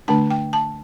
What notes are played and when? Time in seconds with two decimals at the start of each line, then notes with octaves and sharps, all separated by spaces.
0.08 D3 A3 D4 A5
0.31 G5
0.53 A5